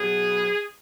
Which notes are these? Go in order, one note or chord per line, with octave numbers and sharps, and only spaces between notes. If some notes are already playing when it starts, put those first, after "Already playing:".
Already playing: B2 F#3 B3 G#4